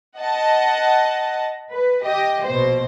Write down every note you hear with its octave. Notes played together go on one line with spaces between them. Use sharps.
D#5 F#5 A5
B4
G4 D#5 G5
A#1 B2 C5